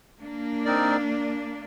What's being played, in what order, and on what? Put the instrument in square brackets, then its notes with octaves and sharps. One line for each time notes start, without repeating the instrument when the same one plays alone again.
[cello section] A#3 D4
[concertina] C4 D#4 A#4 D5